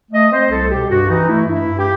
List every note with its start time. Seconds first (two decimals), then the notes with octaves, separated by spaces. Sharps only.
0.12 A3 D#5
0.31 C4 C5
0.50 C2 A4
0.71 B2 G4
0.89 G2 F#4
1.09 E3 D#4
1.28 A3 E4
1.47 G2 E4
1.67 G2
1.77 G4